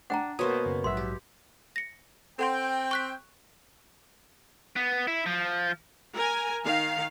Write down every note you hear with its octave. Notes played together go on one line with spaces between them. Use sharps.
D4 F#5 G5 A#5
B2 A#3 C5 C#5 D#5 D#6
F#2 C#3
A#1 G#2 F#3 B3 E5 C6
G4
A#6 C#7
C4 A4 F#5 G5 C6
C#6 F#6 B6
B3
E4
F3
A#4 G#5
D#3 F5